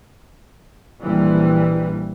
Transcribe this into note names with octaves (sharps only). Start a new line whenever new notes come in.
A#1 E3 G3